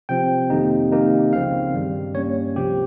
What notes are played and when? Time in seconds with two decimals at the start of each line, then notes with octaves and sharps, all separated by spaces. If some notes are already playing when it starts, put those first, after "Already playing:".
0.09 C3 F3 C4 G5
0.50 F2 C3 D#3 A#3 D#4
0.91 C3 D#3 A#3 D#4
1.33 C#2 C#3 F3 C4 F5
1.73 G2 D#3 G3
2.15 G2 G3 A#3 C#4 C#5
2.56 C#2 C3 F3 G4